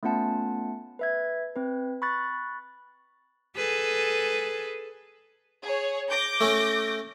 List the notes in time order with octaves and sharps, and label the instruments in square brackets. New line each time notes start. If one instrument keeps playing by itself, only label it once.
[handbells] A3 B3 C#4 F4 F#5 A5
B4 E5 G#6
C4 B4
B5 C#6 F#6 A6
[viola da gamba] G#4 A4 B4
[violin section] G#4 C#5
D6 G6 A#6
[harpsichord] A3 C#4